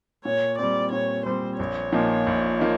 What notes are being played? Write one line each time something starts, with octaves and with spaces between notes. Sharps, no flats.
A#2 C#5
G3 C4 D5
A#2 C#5
G3 C4 C5
A#1 C#5
A#2 F3 A#3 D#4
A#1
F3 A#3 D#4